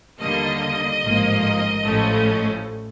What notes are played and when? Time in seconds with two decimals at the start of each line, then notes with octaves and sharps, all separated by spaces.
0.19 D#2 D3 G3 A#3 D#5
1.02 A1 G#2 F3 A#3
1.84 A1 A2 F3 A3 C#4